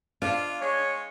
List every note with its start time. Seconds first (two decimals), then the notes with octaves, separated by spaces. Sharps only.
0.22 D4 F4 F5
0.61 G#3 C#5